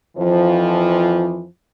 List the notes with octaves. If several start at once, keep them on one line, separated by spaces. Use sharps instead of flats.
F2 E3 F3